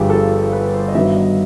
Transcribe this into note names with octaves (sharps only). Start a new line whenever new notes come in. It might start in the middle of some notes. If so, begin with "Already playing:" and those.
Already playing: G1 G2 D3 F3 G4 G#4
A4
B4
C5
D#5
G2 D#3 F#3 B3 E5
D#5